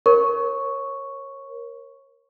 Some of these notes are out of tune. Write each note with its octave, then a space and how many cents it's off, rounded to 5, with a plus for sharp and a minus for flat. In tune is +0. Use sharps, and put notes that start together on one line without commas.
A#4 +15 C#5 -30 C#6 +0